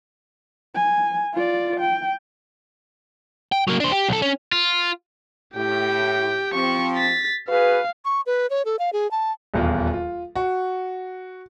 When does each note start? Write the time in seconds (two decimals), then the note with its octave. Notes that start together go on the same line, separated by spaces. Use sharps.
0.75 G#5
1.33 F4 D5
1.80 G5
3.52 G5
3.68 F#3 A#3
3.80 D4 C5
3.92 G4
4.09 B1 A4
4.22 C#4
4.52 F4
5.55 A2 G4 G5
6.54 F3 C4 C#6
6.97 A6 B6
7.49 F#4 G#4 B4 F5
8.05 C#6
8.26 B4
8.50 C#5
8.65 A4
8.79 F5
8.93 G#4
9.11 A5
9.54 D#1 E2 F4
9.93 F4
10.36 F#4